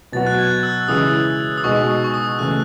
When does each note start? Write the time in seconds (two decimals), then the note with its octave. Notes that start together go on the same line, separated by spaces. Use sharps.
0.13 B2 F#3 B3 F#4 A6
0.27 F#6
0.39 G#6
0.63 E6
0.83 E6
0.88 C#3 E3 G#3 C#4 E4 D#6
1.58 D#6
1.64 B2 G#3 D#4 F#4 C#6
1.89 D#6
2.04 C#6
2.14 D#6
2.39 C#3 E3 A3 F#6